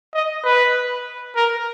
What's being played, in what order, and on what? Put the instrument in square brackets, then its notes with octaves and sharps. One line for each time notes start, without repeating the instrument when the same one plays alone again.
[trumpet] D#5
B4
A#4